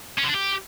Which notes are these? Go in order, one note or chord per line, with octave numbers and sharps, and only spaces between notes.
C#4
D3
D4
G4